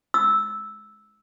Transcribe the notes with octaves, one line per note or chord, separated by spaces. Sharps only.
E6